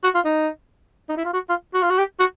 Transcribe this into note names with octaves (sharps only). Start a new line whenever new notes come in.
F#4
F4
D#4
D#4
E4
F4
F#4
F4
F#4
F4
F#4
G4
F#4